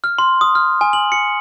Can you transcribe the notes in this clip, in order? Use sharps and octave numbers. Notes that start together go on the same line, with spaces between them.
F6
C6
D#6
F6
G#5
F#7
C#7